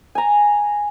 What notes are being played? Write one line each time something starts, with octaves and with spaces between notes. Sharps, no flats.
G#5 A#5